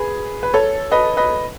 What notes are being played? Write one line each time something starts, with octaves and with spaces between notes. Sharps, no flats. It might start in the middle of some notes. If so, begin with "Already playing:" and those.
Already playing: G#4 B4
B4
A4 C#5
B4 D#5
B4 D#5